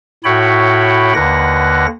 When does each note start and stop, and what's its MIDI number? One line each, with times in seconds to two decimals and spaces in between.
0.24 1.13 45
0.24 1.13 64
0.24 1.13 66
0.24 1.13 73
0.24 1.13 79
0.24 1.13 83
1.14 1.86 39
1.14 1.86 50
1.14 1.86 58
1.14 1.86 71
1.14 1.86 78
1.14 1.86 94